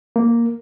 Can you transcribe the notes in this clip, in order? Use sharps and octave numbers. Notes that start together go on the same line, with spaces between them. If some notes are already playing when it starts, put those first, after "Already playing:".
A#3